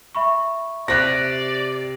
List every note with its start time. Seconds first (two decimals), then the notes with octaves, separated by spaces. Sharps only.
0.15 E5 B5 C#6
0.88 C3 G4 D5 F#6 A#6